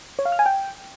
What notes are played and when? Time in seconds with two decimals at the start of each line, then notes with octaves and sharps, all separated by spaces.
0.19 C#5
0.25 F5
0.32 F6
0.39 G#5
0.46 G5